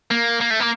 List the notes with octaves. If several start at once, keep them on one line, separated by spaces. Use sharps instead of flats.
A#3
A#3
A3
A#3